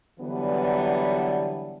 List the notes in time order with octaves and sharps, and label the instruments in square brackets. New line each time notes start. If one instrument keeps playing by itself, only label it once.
[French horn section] D3 E3 F#3 G3 B3